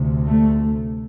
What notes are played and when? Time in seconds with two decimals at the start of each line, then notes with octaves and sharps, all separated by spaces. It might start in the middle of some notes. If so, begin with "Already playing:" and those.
Already playing: D2 C3
0.27 A3